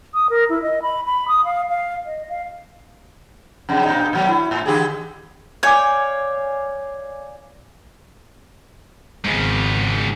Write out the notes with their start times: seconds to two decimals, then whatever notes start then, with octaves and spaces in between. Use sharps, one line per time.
0.14 D#6
0.30 A#4
0.49 E4
0.62 D#5
0.82 B5
1.06 B5
1.28 D#6
1.45 F5
1.69 F5
2.06 D#5
2.29 F5
3.69 F2 C#3 G3
3.84 G2 A#2 D#4
4.13 A#2 F#3 A3
4.28 E4 F#4
4.51 A2
4.66 D3 G4 G#4
5.63 C#5 D5 F5 G#5 D6 G6
9.25 G#1 G#2 C#3